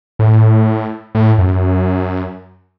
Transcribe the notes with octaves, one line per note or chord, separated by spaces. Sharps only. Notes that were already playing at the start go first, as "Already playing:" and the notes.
A2
A2
F#2